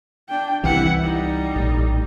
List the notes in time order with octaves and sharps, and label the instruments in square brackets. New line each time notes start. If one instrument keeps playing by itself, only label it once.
[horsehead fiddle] D4 G5
[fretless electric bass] C2 C3 E3 [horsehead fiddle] E4 F#5
[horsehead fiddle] G3 D#4
[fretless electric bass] A#1 A2